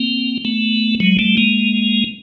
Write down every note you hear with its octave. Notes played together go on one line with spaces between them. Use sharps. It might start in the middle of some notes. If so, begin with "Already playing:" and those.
Already playing: A#3 C4
A3 B3
F#3 G#3
G3 A3
G#3 A#3